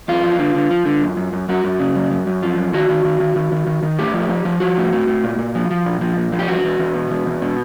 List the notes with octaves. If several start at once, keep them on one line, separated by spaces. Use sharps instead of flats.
E2 F4
F3
D3
D3
F3
D3
F#2
F#2
F#2
F#2 F#4
F#2
C#3
F#2
F#2
F#2
F3
F#2
D#3 F#4
D#3
D#3
D#3
D#3
D#3
D#3
D#3
A2 G4
F3
F3
F3
F3 F#4
A2
A2
A2
A#2
A#2
F3
F3
A#2
F3
A#2
F3
G4
E2 F#4
E2
E2
B2
E2
E2
B2